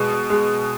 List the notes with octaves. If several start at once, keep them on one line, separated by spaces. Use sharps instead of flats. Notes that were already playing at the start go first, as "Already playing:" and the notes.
Already playing: B2 G#3
G#3